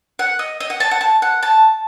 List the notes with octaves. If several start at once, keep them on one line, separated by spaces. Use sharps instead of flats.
F#5
D#5
D#5
F#5
A5
F#5
A5
F#5
A5